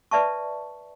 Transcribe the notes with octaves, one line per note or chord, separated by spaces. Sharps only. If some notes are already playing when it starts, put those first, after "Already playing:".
B4 D5 E5 A5 C#6